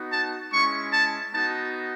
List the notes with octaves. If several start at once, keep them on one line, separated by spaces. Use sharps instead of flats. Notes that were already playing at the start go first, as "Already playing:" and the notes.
Already playing: B3 D#4 F#4
A5
G#3 C#4 E4 C#6
A5
B3 D#4 F#4 A5